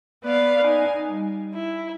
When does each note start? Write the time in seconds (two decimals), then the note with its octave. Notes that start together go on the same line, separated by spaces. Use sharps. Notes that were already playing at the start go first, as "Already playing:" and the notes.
0.23 B3 B4 D5 F5
0.64 D#4 G#5
1.04 G3
1.54 E4